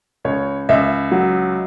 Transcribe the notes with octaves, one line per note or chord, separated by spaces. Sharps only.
C#2 C#5
C#2 E5
F#3